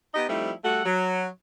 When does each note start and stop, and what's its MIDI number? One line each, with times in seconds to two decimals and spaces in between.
0.14 0.26 59
0.14 0.26 63
0.14 0.26 67
0.14 0.26 75
0.28 0.51 53
0.28 0.51 55
0.28 0.51 57
0.28 0.51 60
0.28 0.51 63
0.28 0.51 64
0.64 0.81 55
0.64 0.81 57
0.64 0.81 66
0.64 0.81 69
0.64 0.81 78
0.85 1.26 54